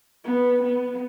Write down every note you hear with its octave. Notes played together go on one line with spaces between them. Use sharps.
B3
B3